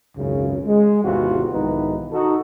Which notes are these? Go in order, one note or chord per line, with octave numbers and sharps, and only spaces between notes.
G#1 C#2 F#2 C#3
G#3
G#1 E2 C3 E3 F4 F#4
B1 G#2 D#3 E3 D#4 B4
D#4 F#4 A4